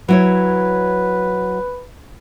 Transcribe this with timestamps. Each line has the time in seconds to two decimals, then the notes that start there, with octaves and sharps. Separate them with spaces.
0.09 F#3 E4 B4 C#5